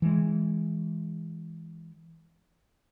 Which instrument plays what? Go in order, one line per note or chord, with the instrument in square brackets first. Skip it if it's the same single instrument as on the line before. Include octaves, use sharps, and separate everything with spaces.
[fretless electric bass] E3 G#3